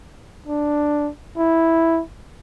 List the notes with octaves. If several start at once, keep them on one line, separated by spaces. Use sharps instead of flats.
D4
E4